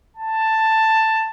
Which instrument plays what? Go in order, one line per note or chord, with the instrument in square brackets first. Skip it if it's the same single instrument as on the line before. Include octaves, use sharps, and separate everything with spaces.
[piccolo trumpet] A5